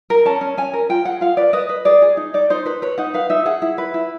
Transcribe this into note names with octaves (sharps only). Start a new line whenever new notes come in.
A#4
C#4 A5
C#4
C#4 G#5
A#4
F4 G5
G#4 F#5
F4 F5
B4 D5
B4 D#5
B4
G#4 D5
G#4
D#4
D#4 D5
D#4 C5
B4 C5
B4 C#5
D#4 F#5
B4 F5
D#4 E5
G#4 F#5
E4
B4
E4